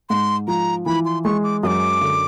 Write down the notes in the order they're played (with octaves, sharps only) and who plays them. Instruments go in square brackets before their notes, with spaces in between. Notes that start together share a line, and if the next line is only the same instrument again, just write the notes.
[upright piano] G#2 [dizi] C6
[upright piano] F3 [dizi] A#5
[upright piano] E3 [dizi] B5
[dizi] C6
[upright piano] G#3 [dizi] C#6
[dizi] D6
[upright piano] F#2 [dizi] D6 D#6
[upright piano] D3